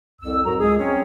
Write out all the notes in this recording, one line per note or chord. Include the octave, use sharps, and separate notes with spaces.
C2 F2 E6
F2 G#2 F#3 F#4 A#4 A#5
C#2 G#3 G#4 D#6
F#3 C4 C#4